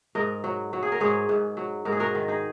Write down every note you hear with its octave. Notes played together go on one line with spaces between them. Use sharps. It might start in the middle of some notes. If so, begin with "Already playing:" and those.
G#2 A#4 D#5
F#3
F#3
G#4
A#4
G#2 G#4 C#5
G#2
F#3
G#2 A#4
G#4
F#4 A#4
D#3
D#4 G#4